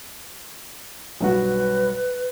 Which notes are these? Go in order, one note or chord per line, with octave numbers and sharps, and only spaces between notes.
B1 G2 F#4 B4